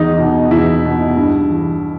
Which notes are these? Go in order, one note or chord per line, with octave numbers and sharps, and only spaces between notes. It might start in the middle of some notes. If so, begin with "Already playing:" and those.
Already playing: E2 D#4
B2
E2 E4
B2
G2
E3